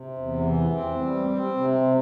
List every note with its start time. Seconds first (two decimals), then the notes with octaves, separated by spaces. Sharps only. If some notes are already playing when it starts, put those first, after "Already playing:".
Already playing: C3
0.18 E2
0.46 E3
0.73 C4
1.02 G3
1.30 C4
1.57 C3